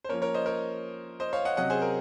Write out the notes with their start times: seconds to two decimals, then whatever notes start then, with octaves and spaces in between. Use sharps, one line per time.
0.04 C5
0.09 F3 A#3 C#4 A#4 C#5
0.22 A#4 C#5
0.34 C5 D#5
0.46 A#4 C#5
1.20 C5 D#5
1.33 C#5 F5
1.45 D#5 F#5
1.57 C3 F#3 C#4 D#5 F#5
1.70 G#4 C5
1.82 A#4